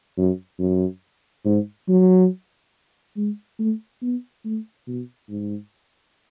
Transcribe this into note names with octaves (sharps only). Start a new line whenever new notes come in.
F#2
F#2
G#2
F#3
G#3
A3
B3
A3
B2
G#2